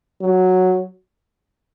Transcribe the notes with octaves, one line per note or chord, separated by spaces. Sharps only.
F#3